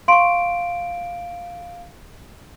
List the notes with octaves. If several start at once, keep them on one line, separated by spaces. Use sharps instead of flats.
F5 C6 C#6 D7